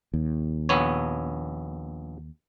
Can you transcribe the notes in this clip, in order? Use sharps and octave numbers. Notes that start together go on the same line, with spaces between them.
D#2
A#1 B3 C#5